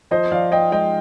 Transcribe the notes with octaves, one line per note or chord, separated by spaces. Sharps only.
F3 C5 D#5
F3 D5 F5
F3 D#5 G5
G#3 D#5 G5